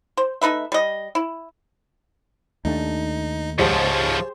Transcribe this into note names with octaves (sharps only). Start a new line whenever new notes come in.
C5
A3 D#4 B4 E5
G3 D#5
E4
D#2 A3 D4 D#4
C#2 G#2 F3 G4 G#4 C5 C#5 A5